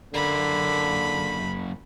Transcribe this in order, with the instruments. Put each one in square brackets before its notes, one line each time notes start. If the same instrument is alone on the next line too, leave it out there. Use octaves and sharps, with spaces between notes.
[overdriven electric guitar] F#2 A#3 [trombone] D3 [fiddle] B5